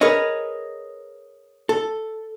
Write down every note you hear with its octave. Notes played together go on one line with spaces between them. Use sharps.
G#4 A#4 B4 C#5 D#5
A4